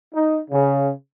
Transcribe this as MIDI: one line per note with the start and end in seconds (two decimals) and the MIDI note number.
0.13 0.38 63
0.51 0.89 49